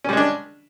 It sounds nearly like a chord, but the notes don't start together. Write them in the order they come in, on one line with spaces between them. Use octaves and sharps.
C#4 G3 G#3 D4